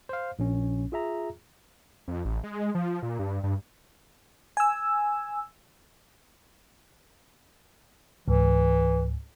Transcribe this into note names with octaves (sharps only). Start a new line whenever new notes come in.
C5 F5
A#1 C#4
F4 G#4 E5 A#5
F2
A1
G#3
F3
A#2
G2
G2
G#5 E6
C#2 G#2 E3